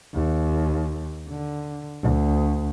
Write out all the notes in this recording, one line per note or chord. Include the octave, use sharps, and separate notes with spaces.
D#2
D3
D2